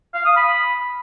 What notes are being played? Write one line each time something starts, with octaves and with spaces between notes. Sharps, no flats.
F5
D#6
B5